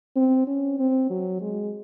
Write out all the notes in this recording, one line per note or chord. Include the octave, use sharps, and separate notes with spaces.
C4
C#4
C4
F#3
G#3